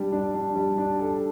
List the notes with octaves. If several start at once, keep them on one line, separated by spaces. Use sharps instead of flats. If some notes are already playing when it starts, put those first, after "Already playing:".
Already playing: G3 D4
D4
D4
G3
D4
A4